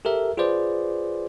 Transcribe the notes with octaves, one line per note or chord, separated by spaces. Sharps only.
G4 A4 A#4 E5
F4 G#4 B4 C5 D5